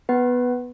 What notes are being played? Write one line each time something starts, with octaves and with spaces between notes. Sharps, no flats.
B3 B4